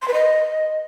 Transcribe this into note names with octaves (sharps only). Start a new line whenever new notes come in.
C6
B4
D#5